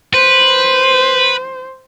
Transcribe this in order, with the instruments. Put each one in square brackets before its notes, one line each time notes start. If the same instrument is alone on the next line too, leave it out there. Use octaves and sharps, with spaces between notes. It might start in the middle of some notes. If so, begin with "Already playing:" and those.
[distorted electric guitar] B4 [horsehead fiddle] C5